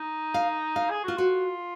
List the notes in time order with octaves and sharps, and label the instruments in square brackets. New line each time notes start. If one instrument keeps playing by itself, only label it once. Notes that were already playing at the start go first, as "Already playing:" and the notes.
Already playing: [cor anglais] D#4
[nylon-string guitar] F5
F5
[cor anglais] G#4
[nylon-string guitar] F4 [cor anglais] F#4
[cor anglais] F4 [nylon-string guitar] F#4